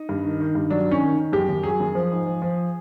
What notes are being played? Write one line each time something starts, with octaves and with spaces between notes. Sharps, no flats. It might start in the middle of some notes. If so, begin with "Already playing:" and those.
Already playing: D#4
G2
D#3
D#3
G2
F#3 D4
D#3 C#4
D#3
D#3
F#2 G4
F#2
F#3 G#4
F#2
F3
G#2
F3
F3